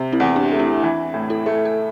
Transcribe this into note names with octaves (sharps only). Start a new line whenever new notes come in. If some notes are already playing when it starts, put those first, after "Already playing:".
Already playing: C3
C4 E4
E2
D4 G4
A3 D4
C4 E4
E3
A2
E4 A4
A3
A4